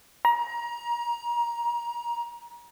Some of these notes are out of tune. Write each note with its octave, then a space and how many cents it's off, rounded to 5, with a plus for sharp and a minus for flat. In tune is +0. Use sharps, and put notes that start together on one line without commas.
A#5 +25